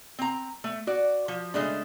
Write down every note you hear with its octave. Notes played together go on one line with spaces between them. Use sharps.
C4 A#5
A3
F#4 D5
F3
C#3 G#3 A3 D4